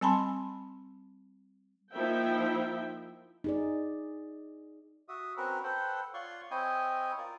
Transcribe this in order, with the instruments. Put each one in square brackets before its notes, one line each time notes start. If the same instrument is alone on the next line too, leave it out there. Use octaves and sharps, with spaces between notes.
[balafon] G3 C4 G#5 A5 B5 C6
[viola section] F3 A#3 D#4 E4 E5 G5
[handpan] D#4 G#4 D5
[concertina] F#4 E5 D#6
C4 C#4 F#4 A#4 B4
A4 B4 C5 F#5 G5
F4 C#5 D5 F#5 C6 C#6
C4 E4 C#5 D#5 G5 G#5
F4 A#4 D5